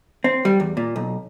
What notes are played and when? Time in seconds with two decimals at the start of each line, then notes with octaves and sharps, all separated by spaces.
0.24 C4
0.45 G3
0.60 E2
0.77 A#2
0.96 B1